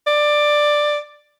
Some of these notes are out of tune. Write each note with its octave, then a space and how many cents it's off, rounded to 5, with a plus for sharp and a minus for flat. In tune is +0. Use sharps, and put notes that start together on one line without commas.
D5 +10